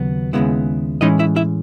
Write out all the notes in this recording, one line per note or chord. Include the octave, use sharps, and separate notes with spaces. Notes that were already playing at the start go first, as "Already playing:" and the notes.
Already playing: D#2 C#3 F#3 B3
D#2 C#3 G#3 B3 E4
A2 E3 G#3 C#4 D#4 E4 D#5
E4 E5
E4 E5